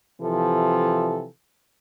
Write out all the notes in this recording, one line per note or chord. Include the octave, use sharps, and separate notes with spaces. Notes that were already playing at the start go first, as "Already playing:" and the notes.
C3 E3 F3 A4